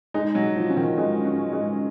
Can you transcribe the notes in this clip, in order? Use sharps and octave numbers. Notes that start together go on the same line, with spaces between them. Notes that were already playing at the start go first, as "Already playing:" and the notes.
G#3 D#4
F#3
G#3
F3
C#4
D#3
G#3
C#4
G#3